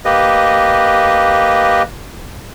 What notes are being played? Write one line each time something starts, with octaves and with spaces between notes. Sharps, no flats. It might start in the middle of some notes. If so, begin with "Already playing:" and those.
A#3 G4 B4 D#5